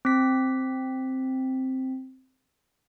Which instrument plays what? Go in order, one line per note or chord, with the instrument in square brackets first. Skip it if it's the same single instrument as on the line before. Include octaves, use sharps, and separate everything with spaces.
[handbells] C4 B6